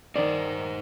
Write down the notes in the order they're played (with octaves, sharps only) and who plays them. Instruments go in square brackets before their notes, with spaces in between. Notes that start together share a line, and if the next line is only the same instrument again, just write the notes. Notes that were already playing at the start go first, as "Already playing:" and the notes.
[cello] D#3 [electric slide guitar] D#4 C5 [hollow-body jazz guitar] D5